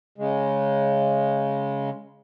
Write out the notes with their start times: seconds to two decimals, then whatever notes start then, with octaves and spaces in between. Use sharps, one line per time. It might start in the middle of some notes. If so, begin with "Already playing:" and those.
0.18 C#3 G#3